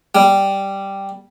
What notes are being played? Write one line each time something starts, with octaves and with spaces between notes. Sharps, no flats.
G3